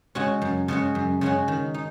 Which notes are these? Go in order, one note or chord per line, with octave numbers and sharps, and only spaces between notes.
C#3 G#3 C#4 F#4
F#2
C#3 G#3 C#4 F#4
F#2
C#3 G#3 C#4 F#4
D#3
D#4